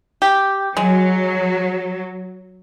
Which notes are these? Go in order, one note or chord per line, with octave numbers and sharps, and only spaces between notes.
G4
F#3 G#3